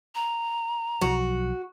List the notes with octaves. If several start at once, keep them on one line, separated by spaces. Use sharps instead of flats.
A#5
B1 F3 F#3 F#4